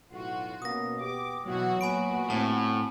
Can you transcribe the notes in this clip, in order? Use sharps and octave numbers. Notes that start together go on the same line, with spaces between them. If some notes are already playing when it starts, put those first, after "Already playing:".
B1 A2 F4 F#4
B2 A#3 B3 C#4 D#6 A#6
B3 G4 D6
B2 E3 F#3 F#4
A#2 B3 F#4 G#5 B5 D7
A2 C4 A5